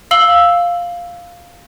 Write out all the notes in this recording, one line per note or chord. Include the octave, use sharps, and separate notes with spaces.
F5 E6 F#7 G7